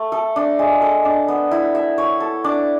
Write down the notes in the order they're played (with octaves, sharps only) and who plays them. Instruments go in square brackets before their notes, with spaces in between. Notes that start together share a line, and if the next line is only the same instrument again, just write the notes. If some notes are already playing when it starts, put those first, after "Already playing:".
Already playing: [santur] A3
A4
D4
G#3
A4
D4
B3
E4
E5
C#5
A4
D4